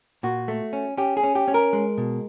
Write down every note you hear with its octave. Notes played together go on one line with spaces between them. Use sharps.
A#2 F#4
A3
C#4
C#4 G4
G#4
C#4
G4
C#4
A#4
G#3
B2